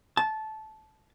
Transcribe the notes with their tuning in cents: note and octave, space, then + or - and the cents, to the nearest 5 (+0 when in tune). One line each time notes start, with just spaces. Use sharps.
A5 -15